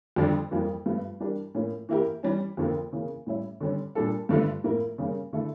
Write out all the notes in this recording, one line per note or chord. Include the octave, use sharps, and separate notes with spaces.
F2 D3 G3 D4
F2 E3 G3 A#3
G2 F3 A3
E3 G3 D4 G4 A#4
A2 F3 A#3 C#4
E3 A#3 E4 G4 A#4
E3 G3 C#4
F2 D3 F3 A#3
C#3 E3 A#3
A2 G3 C#4 E4
D3 G3 C#4
A#2 G3 D4 A4
G2 D3 F3 A3
A2 F3 A#3 E4 A#4
C#3 G3 A#3 C#4
D3 A3 E4 A4